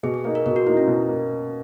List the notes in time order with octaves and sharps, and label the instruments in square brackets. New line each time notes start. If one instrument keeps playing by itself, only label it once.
[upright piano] B2 [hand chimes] G#4
[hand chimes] G#4
[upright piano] A#3 D#4 [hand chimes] G#4
[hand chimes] A#4
[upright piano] B2 [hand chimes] A#4
[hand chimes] F#4
[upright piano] A#3 D#4 [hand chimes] E4
[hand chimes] C#4
[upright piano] B2
A#3